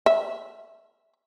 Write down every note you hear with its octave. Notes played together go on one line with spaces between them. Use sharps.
E5